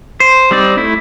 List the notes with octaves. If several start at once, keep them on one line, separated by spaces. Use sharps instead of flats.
C5
G3 C4 D#4 D5
A3 E4